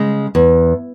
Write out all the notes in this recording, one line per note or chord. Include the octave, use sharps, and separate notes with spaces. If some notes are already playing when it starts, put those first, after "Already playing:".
Already playing: C#3 G#3
E2